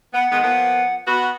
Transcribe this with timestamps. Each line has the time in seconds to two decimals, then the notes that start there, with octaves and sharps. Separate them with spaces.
0.14 B3 F#5
0.32 D#3 G#3 B3
0.44 F3 A#3 B3
1.07 B3 F#4 B5